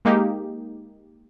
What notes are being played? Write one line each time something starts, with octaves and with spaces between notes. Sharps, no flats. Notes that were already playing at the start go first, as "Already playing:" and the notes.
G#3 A#3 D#4 G4